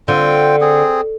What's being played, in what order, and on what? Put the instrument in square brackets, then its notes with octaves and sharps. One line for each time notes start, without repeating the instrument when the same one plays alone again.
[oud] D3 [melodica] C4 F4 G5
[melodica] C4 G#4